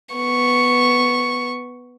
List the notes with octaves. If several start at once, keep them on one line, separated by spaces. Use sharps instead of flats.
B3 C#6